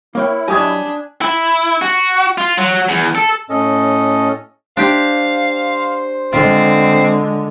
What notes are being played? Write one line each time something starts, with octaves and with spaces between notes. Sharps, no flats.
A#3 E4 C#5 G5
F#3 D4 G4 D#5 G#5 B5 D#6 G#6
E4
F#4
F4
F#3
E2
A4
A2 C#4 A4 D#5
D4 G4 C5 F5
D3 G#3 C4 F4